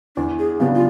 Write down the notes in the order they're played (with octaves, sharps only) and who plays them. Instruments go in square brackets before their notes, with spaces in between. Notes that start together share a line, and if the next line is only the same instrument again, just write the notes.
[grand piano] E2 [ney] D4
[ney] G#4
[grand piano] C#3 F#3 B3 D4 [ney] G4
[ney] F4